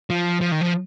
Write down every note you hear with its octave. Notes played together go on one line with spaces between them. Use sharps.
F3
F3
D#3
F3